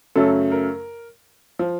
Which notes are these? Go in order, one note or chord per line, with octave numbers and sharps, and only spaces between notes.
F#2 C#3 F#3 A3 A4
A#4
F3